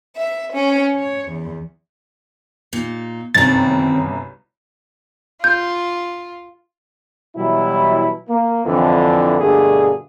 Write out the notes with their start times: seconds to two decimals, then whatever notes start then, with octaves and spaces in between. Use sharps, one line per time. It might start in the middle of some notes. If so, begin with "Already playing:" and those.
0.16 E5
0.53 C#4
0.94 C#5
1.29 E2
2.73 A#2 D#4
3.34 G1 C2 F#2 D#3 C4 A6
5.44 F4 G6
7.35 B2 E3 F#3 G3 E4
8.29 A#3
8.65 F2 D3 E3
9.39 G2 B2 D3 A3 A#3 G#4